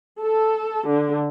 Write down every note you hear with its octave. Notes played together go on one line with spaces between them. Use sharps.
A4
D3